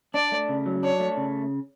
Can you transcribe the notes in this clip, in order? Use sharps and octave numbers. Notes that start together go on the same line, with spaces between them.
D4 D5
A3
C#3
F#3
D4 C#5
A3
C#3